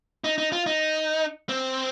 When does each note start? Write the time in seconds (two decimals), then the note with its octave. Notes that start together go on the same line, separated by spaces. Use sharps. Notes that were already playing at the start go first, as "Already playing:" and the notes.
0.24 D#4
0.38 D#4
0.52 F4
0.66 D#4
1.49 C4